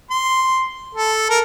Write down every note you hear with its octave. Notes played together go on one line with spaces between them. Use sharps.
C6
A4
A#4